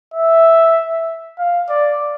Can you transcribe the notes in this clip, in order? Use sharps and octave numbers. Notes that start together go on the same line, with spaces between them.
E5
F5
D5